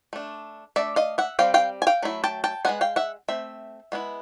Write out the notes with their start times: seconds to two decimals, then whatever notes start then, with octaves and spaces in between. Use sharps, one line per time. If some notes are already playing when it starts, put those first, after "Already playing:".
0.13 A3 D4
0.76 A3 D4 D5 E5
0.96 D#5 F5
1.18 E5 F#5
1.39 G3 C4 F5 G5
1.54 F5 G5
1.82 G#5
1.87 F5 G5
2.02 F#3 A3 E4
2.24 G5 A5
2.44 G5 A5
2.65 G#3 B3 D#4 F#5 G#5
2.81 F5 G5
2.96 E5 F#5
3.28 A3 C4 E5
3.92 G#3 B3 E4